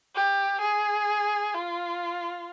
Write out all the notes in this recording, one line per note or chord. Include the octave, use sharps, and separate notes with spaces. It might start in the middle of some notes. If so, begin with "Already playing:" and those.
G4
G#4
F4